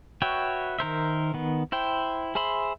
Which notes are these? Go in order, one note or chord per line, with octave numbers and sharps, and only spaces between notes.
F#4 B4 C#5 E5 G5
D#3 A#4 C5 E5
D#3 B3
E4 C5 G5
G#4 C5 E5 B5 C6